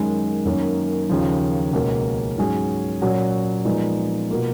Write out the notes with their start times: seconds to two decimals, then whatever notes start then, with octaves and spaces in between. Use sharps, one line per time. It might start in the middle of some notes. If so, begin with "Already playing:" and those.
Already playing: F#2 D#3 G#3
0.45 F#2 D#3 A#3 C#4
1.09 D#2 C#3 F3
1.73 C#2 B2 A#3 C#4
2.38 G#2 F#3 C#4 G#4
3.02 A#2 F#3 C#4 F#4
3.65 A#2 F3 G#3 B3 D#4
4.29 B2 A#3 F4